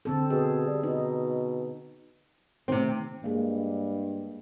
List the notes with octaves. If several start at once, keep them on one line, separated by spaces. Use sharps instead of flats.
D3 C4 A4
B2 G#4
G3
B2 D#4
C3 D#3 A3 C4 D#4
G2 G#3 A#3